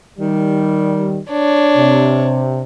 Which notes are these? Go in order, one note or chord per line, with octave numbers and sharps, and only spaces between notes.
D#3 G3
D4 C#5
C3